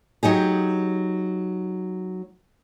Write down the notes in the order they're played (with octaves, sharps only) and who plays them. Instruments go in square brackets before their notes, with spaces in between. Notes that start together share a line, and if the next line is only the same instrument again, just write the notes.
[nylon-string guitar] F#3 D#4 G4 G#4